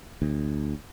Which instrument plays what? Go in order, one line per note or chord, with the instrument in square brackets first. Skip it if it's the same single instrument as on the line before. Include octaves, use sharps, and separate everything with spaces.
[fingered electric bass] D2